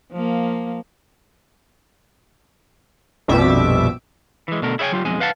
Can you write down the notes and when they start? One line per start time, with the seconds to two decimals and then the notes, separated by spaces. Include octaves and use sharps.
0.12 F3 A#3
3.28 A#1 F2 B2 G3 E5 D6
4.48 E3 G#3
4.62 B2 D3 A3 A#4
4.79 E4 G#4 C#5 F5 G5 G#5
4.92 F#3 F4 G4
5.05 B1 F2 G#3 G#5
5.20 B4 F5 F#5 A5